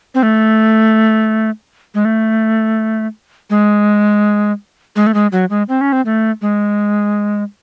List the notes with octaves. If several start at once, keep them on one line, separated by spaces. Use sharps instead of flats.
C4
A3
G#3
A3
G#3
G#3
A3
G#3
F#3
G#3
C4
C#4
C4
A3
G#3